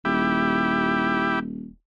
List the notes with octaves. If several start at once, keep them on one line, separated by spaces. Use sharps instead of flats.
D#1 E4 G4